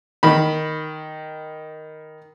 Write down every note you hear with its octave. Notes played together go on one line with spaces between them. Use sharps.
D#3 B5